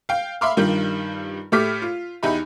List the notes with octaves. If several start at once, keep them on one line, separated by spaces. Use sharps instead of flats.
F5 G5
E5 F5 B5 C6 D6 F6
G2 D#3 G3 F4 G4
A2 A3 G4 D6 F6 B6
F4
E2 D#4 G4 E5 B5